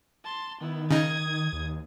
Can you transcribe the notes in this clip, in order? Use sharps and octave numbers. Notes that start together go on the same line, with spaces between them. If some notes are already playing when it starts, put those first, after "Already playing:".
A5 C6
D#3 B3 E4
C#3 D#4 D#6 G#6
D#2